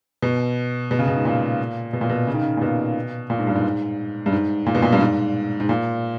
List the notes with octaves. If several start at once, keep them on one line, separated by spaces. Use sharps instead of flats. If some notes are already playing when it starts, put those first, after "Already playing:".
B2
B2
C#3
B2
G#2
A#2
B2
A#2
B2
C#3
D#3
C#3
A#2
B2
A#2
G#2
G2
G#2
G2
G#2
A#2
B2
A#2
G2
G#2
G#2
A#2